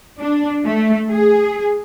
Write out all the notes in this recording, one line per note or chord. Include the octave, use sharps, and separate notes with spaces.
D4
A3
G#4